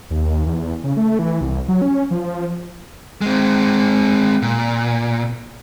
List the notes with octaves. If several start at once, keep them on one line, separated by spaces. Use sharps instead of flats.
D#2
E2
C#3
A3
E3
C2
F#3
C#4
F3
G#3 C4
A#2